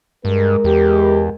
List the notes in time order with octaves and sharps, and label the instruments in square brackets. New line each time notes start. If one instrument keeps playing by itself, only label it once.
[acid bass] G2 [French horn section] G#3 A#4
[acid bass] E2 [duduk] G4